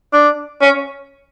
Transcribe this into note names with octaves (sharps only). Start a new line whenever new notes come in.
D4
C#4